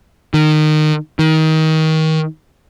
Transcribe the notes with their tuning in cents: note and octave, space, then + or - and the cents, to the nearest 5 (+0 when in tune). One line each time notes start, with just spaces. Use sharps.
D#3 -25
D#3 +25